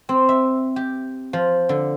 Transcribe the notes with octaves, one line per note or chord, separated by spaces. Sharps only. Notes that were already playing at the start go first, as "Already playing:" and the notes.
C4
E5
G4
F3
D3